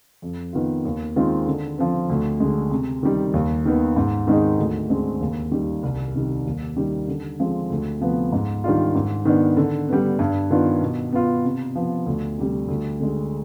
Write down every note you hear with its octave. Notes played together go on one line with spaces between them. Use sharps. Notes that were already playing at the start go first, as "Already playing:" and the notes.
F2
D#3 B3 F4
D#2
D#3 G#3 C4 F4
D3
F3 C4
D2
D3 G#3
C3
D#3 G3
D#2
D#3 B3
G#2
D#3 G#3 C4 D#4
D2
D3 G#3 C4
D#2
D#3 G3
C2
C3 D#3 G3
D#2
D#3 G3
D3
F3 G#3 C4
D2
C3 F3 B3
G#2
D#3 G3 D4 F4
G#2
D#3 B3 D4
D3
G3 B3
G2
D#3 B3 D4 F4
B2
B3 F4
C3
F3 B3
D2
C3 G3
D2
D3 G#3